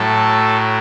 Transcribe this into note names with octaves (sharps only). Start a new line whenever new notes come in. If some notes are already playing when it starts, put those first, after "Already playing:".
Already playing: A2 F#3 A4